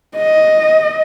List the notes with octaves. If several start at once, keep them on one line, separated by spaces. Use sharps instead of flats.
D#5